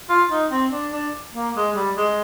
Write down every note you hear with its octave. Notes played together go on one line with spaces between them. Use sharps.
F4
D#4
C4
D4
D4
A#3
G#3
G3
G#3